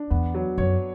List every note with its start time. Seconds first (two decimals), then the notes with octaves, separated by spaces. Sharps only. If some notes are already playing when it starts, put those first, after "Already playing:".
Already playing: D4
0.10 E2 B3
0.34 F#3
0.58 F#2 C#5